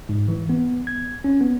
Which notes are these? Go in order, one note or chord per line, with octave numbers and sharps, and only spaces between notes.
G#2
E3
B3
G#6
C#4
B3